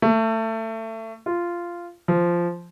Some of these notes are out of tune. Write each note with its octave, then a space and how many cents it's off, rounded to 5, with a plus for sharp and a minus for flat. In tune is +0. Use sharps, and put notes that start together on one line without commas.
A3 +25
F4 -10
F3 -10